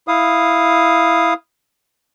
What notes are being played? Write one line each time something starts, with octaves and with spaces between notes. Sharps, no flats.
E4 F5 D#6